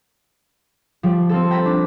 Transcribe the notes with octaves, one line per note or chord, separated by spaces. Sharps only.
F3 G3
C4 F4 A4
G5 A#5 B5 A6
D4